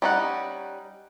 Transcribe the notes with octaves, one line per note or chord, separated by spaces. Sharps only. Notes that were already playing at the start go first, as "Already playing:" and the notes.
G3 C#4 D#4 F4 F#5